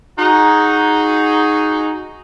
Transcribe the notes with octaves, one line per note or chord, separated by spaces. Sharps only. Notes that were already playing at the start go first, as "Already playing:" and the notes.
D#4 F#4 G#4